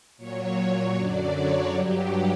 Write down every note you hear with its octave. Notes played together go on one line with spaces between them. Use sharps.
A#2 F#3 C#5
F#2 D3 F#3 D5
C#5
G2 F#3 G4